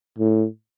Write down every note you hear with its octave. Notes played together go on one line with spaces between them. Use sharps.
A2